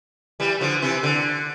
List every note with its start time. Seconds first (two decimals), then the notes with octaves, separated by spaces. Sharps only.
0.40 E3 G3
0.61 D3 F3
0.82 C3 E3
1.03 D3